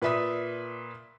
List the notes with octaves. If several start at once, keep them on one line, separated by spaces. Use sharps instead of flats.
A#2 B4 D5 E5 D#6 B6